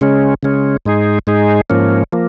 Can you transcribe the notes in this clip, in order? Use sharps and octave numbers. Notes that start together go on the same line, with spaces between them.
C#3 G#3 C#4
C#3 G#3 C#4
G#2 G#3 D#4 G#4
G#2 G#3 D#4 G#4
G#2 F3 A#3 C#4
F3 A#3